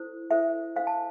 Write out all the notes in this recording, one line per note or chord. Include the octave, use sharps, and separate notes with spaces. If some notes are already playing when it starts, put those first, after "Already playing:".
Already playing: E4 A4 C5
E4 A4 C5 E5
D4 A4 C5 F5
A5